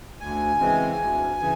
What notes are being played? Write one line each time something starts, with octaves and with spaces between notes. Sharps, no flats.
D2 G#5
C#3 E3 G#3 C4
D2
C#3 E3